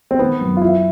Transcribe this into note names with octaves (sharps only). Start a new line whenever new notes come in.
C4
D#3 B3
F#2
F4
E3 E4